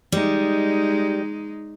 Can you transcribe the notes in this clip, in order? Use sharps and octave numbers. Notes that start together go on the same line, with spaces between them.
G3 G#3 D#4